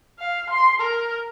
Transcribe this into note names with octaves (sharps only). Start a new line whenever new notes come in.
F5
C6
A#4